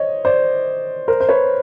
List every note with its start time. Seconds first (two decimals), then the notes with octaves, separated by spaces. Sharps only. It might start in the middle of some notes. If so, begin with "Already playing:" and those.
Already playing: C5 C#5 D#5
0.25 C5 D5
1.08 A#4 C5
1.20 C5
1.29 B4 C#5